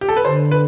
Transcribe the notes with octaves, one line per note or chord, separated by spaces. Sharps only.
G4
A4
B4
D3 C5
B4